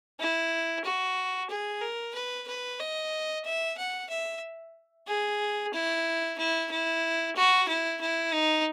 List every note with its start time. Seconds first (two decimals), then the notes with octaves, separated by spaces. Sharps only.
0.19 E4
0.84 F#4
1.50 G#4
1.82 A#4
2.14 B4
2.47 B4
2.80 D#5
3.45 E5
3.78 F#5
4.10 E5
5.07 G#4
5.73 E4
6.38 E4
6.71 E4
7.35 F#4
7.68 E4
8.01 E4
8.33 D#4